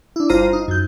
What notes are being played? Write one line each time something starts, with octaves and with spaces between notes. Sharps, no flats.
D4 E4
G1 F4 C5 A#5 D#7
D#4
F#2 G6